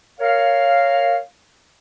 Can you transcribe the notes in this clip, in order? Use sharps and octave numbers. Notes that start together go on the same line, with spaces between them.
A#4 C#5 F5